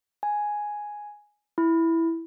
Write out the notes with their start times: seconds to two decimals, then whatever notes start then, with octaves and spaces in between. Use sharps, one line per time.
0.23 G#5
1.58 E4